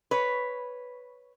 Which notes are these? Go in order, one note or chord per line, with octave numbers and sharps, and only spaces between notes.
B4 C#5